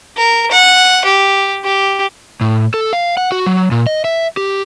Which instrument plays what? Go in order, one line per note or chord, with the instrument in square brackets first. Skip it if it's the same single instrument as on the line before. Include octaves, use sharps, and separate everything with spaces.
[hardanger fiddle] A#4
F#5
G4
G4
[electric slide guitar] A2
A4
F5
F#5
F#4
F#3
A#2
D#5
E5
G4